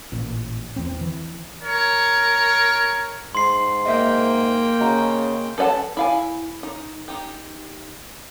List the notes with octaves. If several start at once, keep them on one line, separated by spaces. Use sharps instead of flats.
A1 A#2
E1 E2 C4
E3
A#4 C#5
G#2 C6 C7
A#3 D#5 E5 G5
C#3 F#4 D#5 A#5
A4 B4 D5 F#5 A5
E4 F5 G#5
D#4
D#4 G4